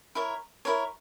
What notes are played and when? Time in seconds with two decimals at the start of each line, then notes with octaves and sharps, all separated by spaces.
0.15 E4 A#4 C#5
0.65 E4 A#4 C#5